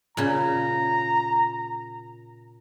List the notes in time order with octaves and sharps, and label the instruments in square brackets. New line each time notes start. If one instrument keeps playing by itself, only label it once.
[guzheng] A#2 C#3 [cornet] A#5